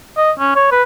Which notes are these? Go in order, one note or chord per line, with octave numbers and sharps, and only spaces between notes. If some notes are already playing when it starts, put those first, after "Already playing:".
D#5
C#4
C#5
B4